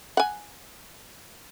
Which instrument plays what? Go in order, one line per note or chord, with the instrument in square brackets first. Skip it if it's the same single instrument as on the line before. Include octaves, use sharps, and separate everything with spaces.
[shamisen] F#5 G#5